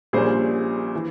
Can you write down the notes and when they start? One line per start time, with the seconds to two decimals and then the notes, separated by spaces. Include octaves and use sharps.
0.13 A#1 A#2 G3 C#4 G#4 C5
0.95 E3